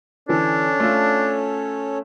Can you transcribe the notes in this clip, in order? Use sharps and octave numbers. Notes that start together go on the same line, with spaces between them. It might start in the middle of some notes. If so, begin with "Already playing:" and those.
D3 E3 C#4 D4 A4 C#5
A3 F4